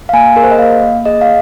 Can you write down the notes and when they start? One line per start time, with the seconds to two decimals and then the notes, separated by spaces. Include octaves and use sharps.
0.09 F5
0.13 A#3 G#5
0.36 G#4 A#4
0.44 C5
0.51 D#5
0.59 A#3 F5
0.82 A#3
1.05 G#4 D#5
1.21 F5